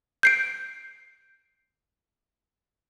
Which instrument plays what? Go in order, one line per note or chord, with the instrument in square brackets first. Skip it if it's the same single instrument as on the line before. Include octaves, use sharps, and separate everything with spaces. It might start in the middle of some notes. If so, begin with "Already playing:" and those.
[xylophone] G6 C7 D7